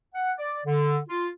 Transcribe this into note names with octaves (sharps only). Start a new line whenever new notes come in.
F#5
D5
D3
F4